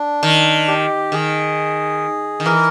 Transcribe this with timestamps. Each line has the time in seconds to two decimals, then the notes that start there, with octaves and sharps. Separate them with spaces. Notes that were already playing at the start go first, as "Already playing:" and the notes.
Already playing: D4
0.23 D#3
0.68 G4
1.12 D#3 G#4
2.40 D#3
2.46 E3 A#4